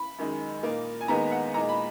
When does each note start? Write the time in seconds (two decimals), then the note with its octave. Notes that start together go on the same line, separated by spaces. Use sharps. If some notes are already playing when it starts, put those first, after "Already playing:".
Already playing: B5
0.18 F#2 D#3 G#3 D#4
0.63 A#2 A#3 D#4
1.01 G#5
1.08 D#2 D#3 G#3 B3 D#4 A#5
1.31 F#5
1.54 A#2 G#3 D#4 A#5
1.69 B5